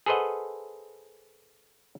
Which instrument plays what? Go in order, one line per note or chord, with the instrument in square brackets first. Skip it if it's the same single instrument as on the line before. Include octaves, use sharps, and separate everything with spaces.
[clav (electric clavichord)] G#4 A4 B4 C5 D#5 F#5